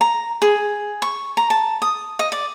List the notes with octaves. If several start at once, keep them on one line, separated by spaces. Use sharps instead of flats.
A#5
G#4
C#6
A#5
A5
D#6
D#5
D5